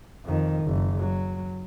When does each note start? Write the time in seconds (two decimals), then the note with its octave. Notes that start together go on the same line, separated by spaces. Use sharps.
0.25 F2 D#3
0.63 F#1
0.98 F#3